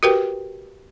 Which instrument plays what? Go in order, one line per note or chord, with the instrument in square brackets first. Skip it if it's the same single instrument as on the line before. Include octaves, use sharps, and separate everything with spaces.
[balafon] F#4 G4 A#4 B4 G5